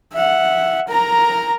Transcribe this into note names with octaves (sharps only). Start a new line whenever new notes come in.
E5 F#5
A#4 A#5